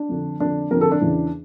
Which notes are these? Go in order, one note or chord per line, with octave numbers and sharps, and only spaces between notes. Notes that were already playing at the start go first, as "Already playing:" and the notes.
Already playing: D4
F2 D3
F2 D3 D4
F2 D3 A#4
A4
D4
E2 C#3 E3